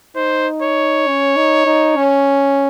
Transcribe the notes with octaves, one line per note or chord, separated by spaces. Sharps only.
D#4 C5
C#5
C#4
D#4
D#4
C#4